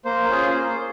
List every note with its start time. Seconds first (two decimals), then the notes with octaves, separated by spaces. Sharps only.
0.05 A#3 C5
0.29 C#4 F4 G#4
0.54 A#3